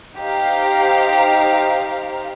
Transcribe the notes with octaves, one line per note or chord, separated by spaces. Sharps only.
D#4 G4 C5 F5 A#5